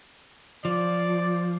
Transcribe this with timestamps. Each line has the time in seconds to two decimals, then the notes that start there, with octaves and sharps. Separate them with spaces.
0.65 F3 D5